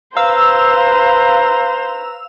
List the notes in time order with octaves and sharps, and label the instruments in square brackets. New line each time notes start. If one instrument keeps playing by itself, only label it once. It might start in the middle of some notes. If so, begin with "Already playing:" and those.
[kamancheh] B4 A#5 [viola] C5 [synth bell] F5 E6